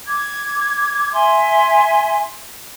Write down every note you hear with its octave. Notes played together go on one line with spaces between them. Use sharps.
D6 G#6
E5 G#5 C6